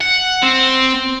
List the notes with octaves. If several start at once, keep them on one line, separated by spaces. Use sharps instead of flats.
F#5
C4